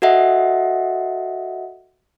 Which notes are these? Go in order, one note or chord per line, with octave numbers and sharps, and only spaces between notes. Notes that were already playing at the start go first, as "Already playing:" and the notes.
F#4 A4 D#5 E5 F#5